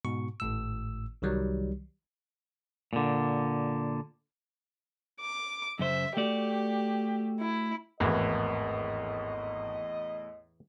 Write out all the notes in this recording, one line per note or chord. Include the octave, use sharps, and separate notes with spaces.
G#2 B2 C#6
G#1 A2 E6
C2 D#3 F#3 G3
A#2 D3
D6
F#2 C#3 C5 E5
A3 F#4 G4 D5
E4
G#1 E2 A2 E3 D#5